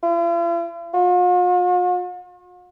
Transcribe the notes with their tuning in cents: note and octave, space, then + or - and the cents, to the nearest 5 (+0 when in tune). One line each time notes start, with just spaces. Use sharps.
F4 -45
F4 +45